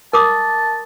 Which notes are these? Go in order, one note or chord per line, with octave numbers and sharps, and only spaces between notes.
A#4 A5 D6 D#6